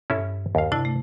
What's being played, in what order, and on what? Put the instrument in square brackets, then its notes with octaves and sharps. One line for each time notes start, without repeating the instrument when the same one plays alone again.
[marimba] G2 [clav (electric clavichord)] C#4 E4 A4
[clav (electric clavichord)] D#2 F5
[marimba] C3 E4 A5 [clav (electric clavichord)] D4
[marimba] A3